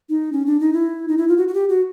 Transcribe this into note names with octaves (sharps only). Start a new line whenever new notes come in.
D#4
C#4
D4
D#4
E4
D#4
E4
F4
F#4
F#4
G4
F#4